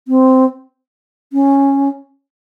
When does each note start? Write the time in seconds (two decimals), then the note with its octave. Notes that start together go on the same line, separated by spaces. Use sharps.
0.08 C4
1.33 C#4